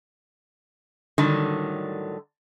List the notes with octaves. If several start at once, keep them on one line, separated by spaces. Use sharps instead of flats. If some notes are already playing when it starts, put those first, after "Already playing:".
A2 D3 D#3 F#3 G3